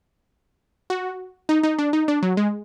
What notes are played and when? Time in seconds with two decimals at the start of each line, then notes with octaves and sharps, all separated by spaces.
0.90 F#4
1.49 D#4
1.63 D#4
1.79 D4
1.93 D#4
2.08 D4
2.23 F#3
2.37 G#3